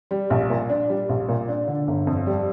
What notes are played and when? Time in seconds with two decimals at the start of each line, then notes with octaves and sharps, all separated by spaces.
0.11 G3
0.30 A#1
0.50 A#2
0.70 D4
0.89 G3
1.09 A#1
1.29 A#2
1.48 D4
1.67 D3
1.88 G1
2.07 F2
2.27 G3